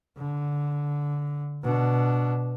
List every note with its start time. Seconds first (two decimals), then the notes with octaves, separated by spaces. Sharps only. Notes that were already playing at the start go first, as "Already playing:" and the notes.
0.18 D3
1.63 B2 D4